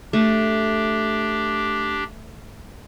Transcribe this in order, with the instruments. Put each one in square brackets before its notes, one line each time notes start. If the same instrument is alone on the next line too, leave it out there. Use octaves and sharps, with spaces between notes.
[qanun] A3 [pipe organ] D4 G4